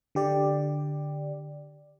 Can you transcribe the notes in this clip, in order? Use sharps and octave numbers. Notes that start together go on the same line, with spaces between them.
D3 G4 D5